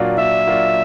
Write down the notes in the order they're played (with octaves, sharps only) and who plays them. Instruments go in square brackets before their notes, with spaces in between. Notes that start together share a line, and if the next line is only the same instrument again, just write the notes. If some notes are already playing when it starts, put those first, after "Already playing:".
Already playing: [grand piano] A#2 F#3 A#3 D4 F4
[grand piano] A#2 [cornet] E5
[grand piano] F#3 A#3 D4 F4